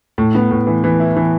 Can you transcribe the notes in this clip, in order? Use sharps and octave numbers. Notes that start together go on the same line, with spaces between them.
A2
B3
A2
E3
E3
E4
E3